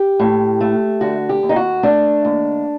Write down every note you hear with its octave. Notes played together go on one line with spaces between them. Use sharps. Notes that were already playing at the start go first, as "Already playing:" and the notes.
Already playing: G4
A2
A3
D3 F#4
G4
D#2
D#4
F#4
A3 D4
D#2